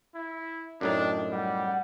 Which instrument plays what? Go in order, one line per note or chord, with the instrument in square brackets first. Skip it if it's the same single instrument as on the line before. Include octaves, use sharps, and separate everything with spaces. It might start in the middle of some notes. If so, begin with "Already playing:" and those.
[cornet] E4
[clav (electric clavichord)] F#2 A2 D#4 [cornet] D4 [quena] G5
[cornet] G3 [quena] F#5